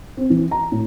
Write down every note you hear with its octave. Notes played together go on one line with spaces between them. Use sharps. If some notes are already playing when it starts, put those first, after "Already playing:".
C4
E3
A#5
A2